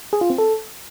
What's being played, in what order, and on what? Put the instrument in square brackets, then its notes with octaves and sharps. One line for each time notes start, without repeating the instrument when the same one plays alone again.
[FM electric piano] G#4
F4
C4
A4